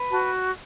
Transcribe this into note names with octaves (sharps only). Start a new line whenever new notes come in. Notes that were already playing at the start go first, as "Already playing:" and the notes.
Already playing: B4
F#4 A5